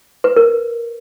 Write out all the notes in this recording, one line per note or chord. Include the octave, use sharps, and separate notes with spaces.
B4
A#4